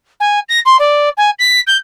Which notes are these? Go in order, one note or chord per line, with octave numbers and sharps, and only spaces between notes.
G#5
A#6
C6
D5
G#5
B6
G6